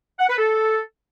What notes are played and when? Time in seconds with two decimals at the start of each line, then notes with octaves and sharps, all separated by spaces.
0.19 F#5
0.29 B4
0.38 A4